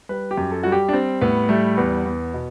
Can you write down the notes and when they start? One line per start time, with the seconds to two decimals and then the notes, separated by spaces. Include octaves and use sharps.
0.09 G3 B4
0.31 G4
0.37 F#2
0.51 A4
0.63 G3 F#4
0.72 G4
0.89 D4
0.93 G3 C4
1.21 A2 B3
1.49 G3 A3
1.77 E2 B3
2.05 E2
2.34 B2